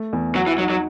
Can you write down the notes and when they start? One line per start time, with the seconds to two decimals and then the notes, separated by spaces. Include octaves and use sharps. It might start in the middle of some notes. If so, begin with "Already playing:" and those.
Already playing: A3
0.13 E2
0.35 F#3 F#4
0.47 E3
0.58 F#3 D#4
0.70 F#3